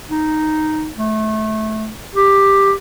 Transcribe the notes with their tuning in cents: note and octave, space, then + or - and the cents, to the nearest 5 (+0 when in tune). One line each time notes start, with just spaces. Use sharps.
D#4 -5
A3 -20
G4 +10